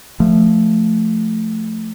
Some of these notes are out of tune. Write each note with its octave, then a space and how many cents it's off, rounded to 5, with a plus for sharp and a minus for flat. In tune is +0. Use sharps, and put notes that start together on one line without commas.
F3 +0 A3 +0